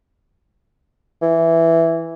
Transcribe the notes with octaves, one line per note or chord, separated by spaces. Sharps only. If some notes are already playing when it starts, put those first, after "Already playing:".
E3